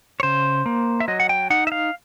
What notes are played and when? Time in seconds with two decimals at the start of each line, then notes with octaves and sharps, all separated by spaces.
0.20 C#5
0.23 C#3 C5
0.66 A#3
1.00 E5
1.08 F#3 D#5
1.20 F#5
1.29 G5
1.50 D#4 F#5
1.67 E5
1.72 F5